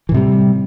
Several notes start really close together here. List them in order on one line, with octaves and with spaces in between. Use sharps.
E3 A2 C3 G3